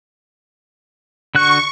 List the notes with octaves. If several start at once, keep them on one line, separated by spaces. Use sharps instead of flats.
D3 F#4 C#6 F#6